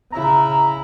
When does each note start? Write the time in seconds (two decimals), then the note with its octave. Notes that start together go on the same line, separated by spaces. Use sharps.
0.12 C#3 E4 A#5